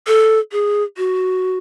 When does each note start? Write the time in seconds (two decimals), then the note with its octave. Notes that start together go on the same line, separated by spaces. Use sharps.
0.07 A4
0.52 G#4
0.97 F#4